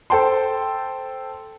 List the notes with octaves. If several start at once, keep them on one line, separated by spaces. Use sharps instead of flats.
A4 C5 G5 A5 C6